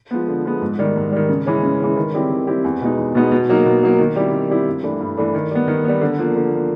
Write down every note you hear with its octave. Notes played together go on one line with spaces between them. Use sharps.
F3 G#3 B3
D3
F3 G#3 B3
G#2
D#3 G3
G#2
D#3 G3
C#3
E3 G#3 C#4
C#3
E3 G#3 C#4
D#3
G3 C4 E4 G4
D#3
G3 C4 E4 G4
E2
B2 G#3 B3 D#4
E2
B2 G#3 B3 D#4
B2
F#3 A#3 D#4
B2
F#3 A#3 D#4
D#3
G3 C4 E4 G4
D#3
G3 C4 E4 G4
G2
E3 A3 D4
G2
E3 A3 D4
D#3
G3 B3
D#3
G3 B3
D3
F3 A#3
D3
F3 A#3